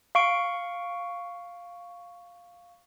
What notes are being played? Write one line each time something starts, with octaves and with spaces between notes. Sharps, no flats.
F5 C#6 D7